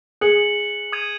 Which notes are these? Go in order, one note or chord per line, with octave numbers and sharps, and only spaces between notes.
G#4 F#6 C#7 F#7
D#6 G#6 D#7